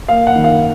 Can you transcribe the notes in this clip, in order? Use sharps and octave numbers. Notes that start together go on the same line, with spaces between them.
A#3 F5
F#5
D#3
F5